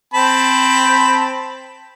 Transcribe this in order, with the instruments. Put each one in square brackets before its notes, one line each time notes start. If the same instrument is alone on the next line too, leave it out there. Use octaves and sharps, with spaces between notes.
[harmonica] C4 A5 B5